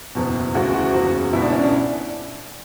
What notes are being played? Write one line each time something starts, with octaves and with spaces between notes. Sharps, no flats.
F#1 E2 B2
D2 C#3 E3 F#4
F#4
F#1 E2 C#3 E3 F#4
C#2 B2 E4
D4
C#4
D4